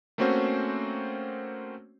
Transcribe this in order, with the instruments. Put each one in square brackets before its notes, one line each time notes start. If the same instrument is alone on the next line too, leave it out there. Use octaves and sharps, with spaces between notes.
[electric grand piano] A3 A#3 C4 C#4 F#4 C5